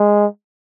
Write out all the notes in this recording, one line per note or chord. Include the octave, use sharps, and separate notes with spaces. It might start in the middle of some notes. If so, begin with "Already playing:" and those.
Already playing: G#3